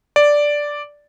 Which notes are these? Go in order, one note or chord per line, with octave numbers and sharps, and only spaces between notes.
D5